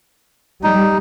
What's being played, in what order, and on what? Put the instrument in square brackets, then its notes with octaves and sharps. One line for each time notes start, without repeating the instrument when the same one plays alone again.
[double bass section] G3 [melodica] D#4